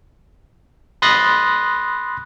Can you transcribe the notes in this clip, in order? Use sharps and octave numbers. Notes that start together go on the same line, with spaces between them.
B5 C6 D#6 F#6 A6 A#6